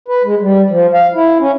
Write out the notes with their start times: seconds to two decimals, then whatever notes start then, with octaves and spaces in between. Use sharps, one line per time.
0.08 B4
0.24 G#3
0.41 G3
0.70 F3
0.94 F5
1.15 E4
1.40 C#4